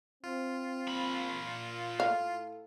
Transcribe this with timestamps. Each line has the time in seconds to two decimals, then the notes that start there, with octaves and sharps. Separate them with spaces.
0.24 C4 F4
0.88 A#2 B5
2.00 A2 A4 F5